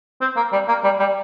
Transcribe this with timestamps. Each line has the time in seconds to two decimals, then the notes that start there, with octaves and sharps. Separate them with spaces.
0.21 C4
0.36 A#3
0.52 G3
0.68 A#3
0.84 G3
0.99 G3